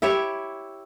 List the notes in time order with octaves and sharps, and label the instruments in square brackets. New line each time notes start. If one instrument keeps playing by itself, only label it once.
[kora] E4 G4 C#5 E5